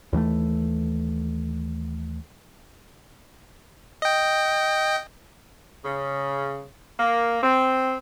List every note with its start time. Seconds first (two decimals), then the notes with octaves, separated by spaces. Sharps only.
0.13 D#2 E3 G#3 A3
4.02 D#5 G5
5.84 C#3
6.99 A#3
7.43 C4